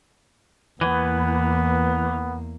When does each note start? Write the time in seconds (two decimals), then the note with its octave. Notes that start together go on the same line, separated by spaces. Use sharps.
0.81 E2 E3 A#3 B3